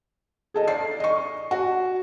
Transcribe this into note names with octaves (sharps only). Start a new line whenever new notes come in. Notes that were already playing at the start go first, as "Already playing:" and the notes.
G#4 A4 D#5
D5 C7
D#5 C#6
F#4